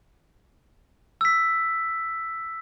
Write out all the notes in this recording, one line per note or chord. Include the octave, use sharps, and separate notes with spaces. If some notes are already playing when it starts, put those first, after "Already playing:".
E6 B6